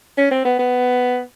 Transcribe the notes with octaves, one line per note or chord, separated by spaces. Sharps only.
C#4
C4
B3
B3